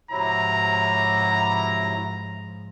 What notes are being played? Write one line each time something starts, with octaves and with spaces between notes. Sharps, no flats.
G#2 C3 F3 F#3 E4 A#5